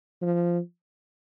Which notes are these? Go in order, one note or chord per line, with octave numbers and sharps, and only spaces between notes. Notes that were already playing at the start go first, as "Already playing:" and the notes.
F3